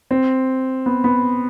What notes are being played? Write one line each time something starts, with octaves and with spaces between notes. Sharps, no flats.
C4
B3
B3